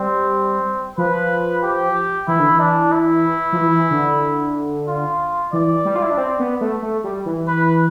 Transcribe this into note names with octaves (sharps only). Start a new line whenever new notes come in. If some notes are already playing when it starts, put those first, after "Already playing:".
Already playing: G3 C4
F3 B4
G4
E3 E4
D3
E3
D4
E4
F3
E3
D3
F4
E3 D5
G3
F4
E4
D4
C4
B3
A3
A3
G3
E3
B4